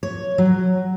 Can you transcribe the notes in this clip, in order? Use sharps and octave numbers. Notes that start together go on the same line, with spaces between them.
C#5
F#3